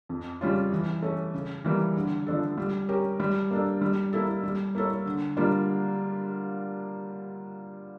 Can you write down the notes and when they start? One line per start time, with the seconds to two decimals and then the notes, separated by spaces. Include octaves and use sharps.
0.09 F2
0.41 C#3 G3 C#4 F4
0.72 E3
1.03 A3 C#4
1.34 C#3
1.65 E3 G3 A#3
1.96 D3
2.26 F3 A3 D4 A4
2.58 G3
2.89 C#4 G4 A#4
3.20 G3
3.51 A#3 D4 A4
3.81 G3
4.13 A#3 E4 A4
4.43 G3
4.75 A#3 E4 A4 C#5
5.06 D3
5.37 G3 A#3 D4 F4